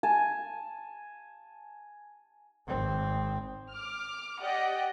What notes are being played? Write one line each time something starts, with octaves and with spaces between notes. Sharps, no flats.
G#5 A5
G#1 C4
D6 F6
G4 D5 D#5 F#5 G5